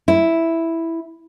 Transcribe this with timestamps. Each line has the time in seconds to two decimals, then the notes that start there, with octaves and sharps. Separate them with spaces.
0.08 E4